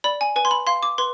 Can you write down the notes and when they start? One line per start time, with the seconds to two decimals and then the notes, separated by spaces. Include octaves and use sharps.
0.04 D5 B5
0.21 G#5
0.36 B4 G#5
0.45 C6
0.51 B5
0.67 F5 C6
0.83 D6
0.98 B4 C6